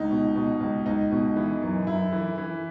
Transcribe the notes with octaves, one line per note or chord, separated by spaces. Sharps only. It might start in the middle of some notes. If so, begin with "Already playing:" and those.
Already playing: C#2 D#4
B2
B2
C#2
C#2 D#4
B2
E3
F#2
F#2 E4
E3
E3